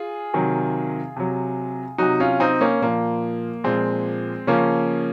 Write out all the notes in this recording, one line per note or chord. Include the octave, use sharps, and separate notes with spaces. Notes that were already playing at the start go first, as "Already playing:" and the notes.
Already playing: F4 G#4
C3 D#3 F#3
C3 F#3
C3 F#3 D#4 F#4
C#4 F4
C4 D#4
A#3 C#4
A#2 F3 A#3
A#2 F3 G#3 C4
C#3 F3 A#3 C#4